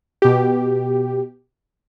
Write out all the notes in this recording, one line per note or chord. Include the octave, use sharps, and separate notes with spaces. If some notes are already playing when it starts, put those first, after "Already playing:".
B2 G4